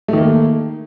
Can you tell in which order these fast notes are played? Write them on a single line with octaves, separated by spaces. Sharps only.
A3 D#3 A#3